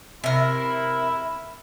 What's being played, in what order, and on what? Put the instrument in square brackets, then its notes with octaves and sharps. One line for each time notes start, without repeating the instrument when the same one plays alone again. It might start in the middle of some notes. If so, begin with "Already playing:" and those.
[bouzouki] C3 A#4 [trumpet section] E4